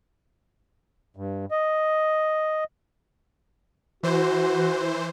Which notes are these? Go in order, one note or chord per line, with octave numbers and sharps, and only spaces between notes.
G2
D#5
E3 F#4 C5